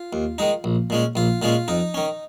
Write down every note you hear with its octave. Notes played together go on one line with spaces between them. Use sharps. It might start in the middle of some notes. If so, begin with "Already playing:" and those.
Already playing: F4
D#2
D#3 G#3 D#4
A#1
A#2 G#3 C#4
A#1 F4
A#2 G#3 C#4 F4
F2 D#4
D#3 C#4